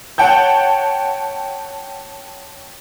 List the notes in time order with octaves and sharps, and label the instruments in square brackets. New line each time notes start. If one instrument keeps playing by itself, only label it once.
[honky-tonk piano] C#5 F#5 G5 A5 G6